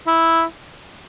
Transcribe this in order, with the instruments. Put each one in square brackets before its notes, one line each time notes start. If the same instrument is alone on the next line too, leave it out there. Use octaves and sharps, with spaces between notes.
[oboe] E4